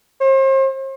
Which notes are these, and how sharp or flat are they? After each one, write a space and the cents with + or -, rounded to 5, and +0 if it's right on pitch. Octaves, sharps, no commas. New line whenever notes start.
C5 +40